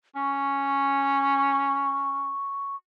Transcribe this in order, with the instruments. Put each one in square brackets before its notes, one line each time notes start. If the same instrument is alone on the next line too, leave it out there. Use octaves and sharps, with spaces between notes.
[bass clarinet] C#4 [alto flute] C#6